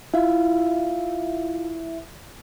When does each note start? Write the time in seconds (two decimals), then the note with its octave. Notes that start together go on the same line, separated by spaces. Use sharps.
0.14 E4 F4 E5 F5